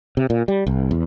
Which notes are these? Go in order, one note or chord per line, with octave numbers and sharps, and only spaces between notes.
C3
A#2
G3
C2
E2